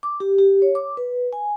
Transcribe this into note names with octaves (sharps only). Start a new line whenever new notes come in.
D6
G4
G4
C#5
D6
B4
G#5